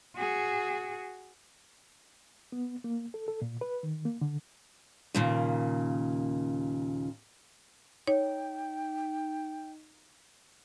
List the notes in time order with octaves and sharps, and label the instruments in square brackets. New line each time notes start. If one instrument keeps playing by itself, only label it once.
[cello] F#4 G#4
[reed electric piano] B3
A#3
A4
A4
A#2
B4
D#3
A#3
D3
[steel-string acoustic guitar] D#2 A#2 C#3
[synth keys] D#4 [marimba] C#5 [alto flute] G5